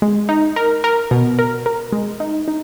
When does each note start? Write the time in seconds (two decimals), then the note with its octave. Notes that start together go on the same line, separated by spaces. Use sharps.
0.02 G#3
0.29 D#4
0.56 A#4
0.84 A#4
1.11 B2
1.39 A#4
1.66 A#4
1.92 G#3
2.20 D#4
2.48 D#4